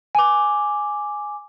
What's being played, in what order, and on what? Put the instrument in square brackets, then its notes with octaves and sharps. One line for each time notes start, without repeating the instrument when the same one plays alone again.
[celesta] G#5 D6